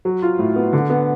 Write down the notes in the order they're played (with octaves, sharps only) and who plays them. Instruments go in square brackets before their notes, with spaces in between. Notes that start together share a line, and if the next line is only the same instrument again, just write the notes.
[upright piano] F#3
F4
A2
B3
D3
B3